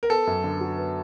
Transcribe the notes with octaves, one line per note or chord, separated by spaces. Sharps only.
A#4
B3 A4
F#2
D3
F#3
B3